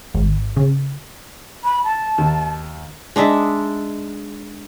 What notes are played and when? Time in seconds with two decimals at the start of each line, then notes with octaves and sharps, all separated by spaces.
0.14 G#1
0.56 C#3
1.64 B5
1.84 A5
2.18 D#2
3.16 G#3 D4 D#4 E5